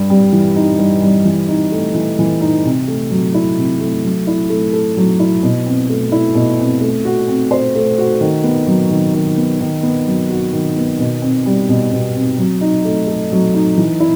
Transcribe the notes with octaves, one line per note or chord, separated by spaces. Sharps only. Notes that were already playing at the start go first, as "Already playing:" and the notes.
Already playing: G2
G3
E3
D#4
G2
G3
E3
D#4
A3
E3
E3
D#4
C3
A3
F#3
E4
C3
A3
F#3
E4
A3
A4
F#3
E4
B2
C4
A3
E4
B2
C4
A3
F#4
C4
C5
A3
F#4
D#3
B3
F#3
D#3
D#3
B3
D#3
B3
F#3
F#4
D#3
B3
B2
C4
G3
B2
B2
C4
F#3
D#4
A3
A4
F#3
D#4
E3
E4